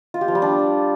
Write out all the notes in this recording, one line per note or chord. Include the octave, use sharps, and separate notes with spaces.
F4
G4
F3
G3
D4